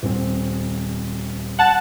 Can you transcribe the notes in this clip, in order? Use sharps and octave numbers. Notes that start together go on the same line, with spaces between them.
D#1 C4
F#5 A5